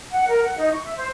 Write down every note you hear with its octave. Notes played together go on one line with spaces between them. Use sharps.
F#5
A#4
F#5
D#4
C#6
E5
C5